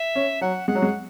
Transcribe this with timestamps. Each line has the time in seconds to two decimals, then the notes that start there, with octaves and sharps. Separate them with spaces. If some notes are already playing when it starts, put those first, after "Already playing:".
Already playing: E5
0.15 C#4
0.41 F#3 F#5
0.68 G#3 F#5
0.75 F#3
0.82 G#3